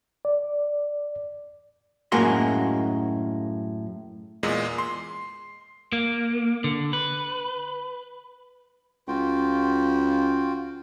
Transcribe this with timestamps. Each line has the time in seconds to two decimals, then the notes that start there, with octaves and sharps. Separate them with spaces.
0.25 D5
2.12 F#2 A2 G#3 A#3 F#4 C6
4.43 E2 A#2 G#3
4.78 C6
5.93 A#3
6.64 D3
6.93 B4
9.08 C#2 F4 F#4 G5